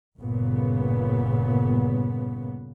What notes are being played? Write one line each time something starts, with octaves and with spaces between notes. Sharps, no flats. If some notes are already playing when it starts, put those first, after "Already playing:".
G1 A#2 C#3 B3